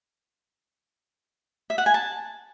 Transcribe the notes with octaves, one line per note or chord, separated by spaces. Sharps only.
E5
F#5
G#5
A5